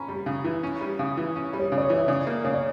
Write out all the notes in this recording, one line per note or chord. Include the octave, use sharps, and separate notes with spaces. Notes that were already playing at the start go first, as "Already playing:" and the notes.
Already playing: C#4 A#5 B5
G3
C#3
E3
C#4
G3
C#3
E3
C#4
G3
C#5
C#3
D5
C#5
E3
E5
C#3 D5
A#3
C#3 C#5
D5